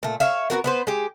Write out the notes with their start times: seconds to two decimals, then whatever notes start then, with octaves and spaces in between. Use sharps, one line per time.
0.03 A#2 A3
0.20 C#5 E5 F5
0.50 B3 C4 F#4 A#4
0.64 B3 B4 C5
0.87 G#3 G4